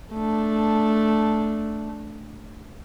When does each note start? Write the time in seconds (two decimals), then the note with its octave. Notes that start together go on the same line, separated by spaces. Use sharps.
0.13 A3 D4